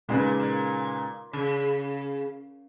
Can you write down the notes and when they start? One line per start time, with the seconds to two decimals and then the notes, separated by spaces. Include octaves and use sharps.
0.09 A#2 C#3 G#3 D#4 G#4 B4
0.40 A#2
1.33 C#3